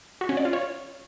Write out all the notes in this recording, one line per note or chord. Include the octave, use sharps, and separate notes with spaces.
F#4
C#4
D5
F4
C#5